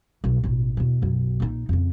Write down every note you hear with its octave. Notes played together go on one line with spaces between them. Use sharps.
B1
A1 B2
E2 B2
B1 F#2
A#1 D#4
F2 C#3